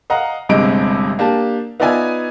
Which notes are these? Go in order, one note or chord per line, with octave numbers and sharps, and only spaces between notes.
D#5 F5 F#5 A#5
G1 G2 C3 G#3 D#5 D7
A#3 D4 G4 A5
B3 D#4 F4 D5 E5 G#5